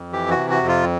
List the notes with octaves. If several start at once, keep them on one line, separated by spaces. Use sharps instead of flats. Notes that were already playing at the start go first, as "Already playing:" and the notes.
Already playing: F2
E3 G4
F#4
C3
F#4
F2
F4